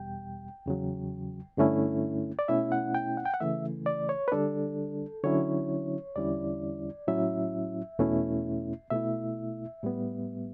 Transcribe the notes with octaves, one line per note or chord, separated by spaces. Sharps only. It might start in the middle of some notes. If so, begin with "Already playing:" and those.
Already playing: E2 B2 G3 G5
E2 C#3 F#3
G2 D3 A3 C#4 E4
D5
B2 A3 C#4 E4 E5
F#5
G5
F#5
G5
F#5
C#3 E3 A3 E5
D5
C#5
B4
D3 G3 D4 A4
D3 F#3 C#4 E4 C#5
E2 D3 G3 C#4 E4 D5
A2 F#3 C#4 E4 E5
E2 B2 A3 C#4 E4
B2 A3 E4 E5
A2 G3 B3